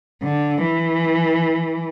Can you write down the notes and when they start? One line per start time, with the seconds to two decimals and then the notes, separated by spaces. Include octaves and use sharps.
0.23 D3
0.62 E3